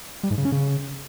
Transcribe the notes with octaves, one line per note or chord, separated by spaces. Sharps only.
G3
G#2
C#3
C#4
C#3